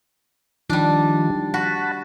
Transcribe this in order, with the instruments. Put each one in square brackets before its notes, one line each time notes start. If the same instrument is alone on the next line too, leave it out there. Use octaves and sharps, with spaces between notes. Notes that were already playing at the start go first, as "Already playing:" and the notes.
[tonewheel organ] D#3 F3 [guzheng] G3 D4
[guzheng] F#4 [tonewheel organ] F#5 A5 B5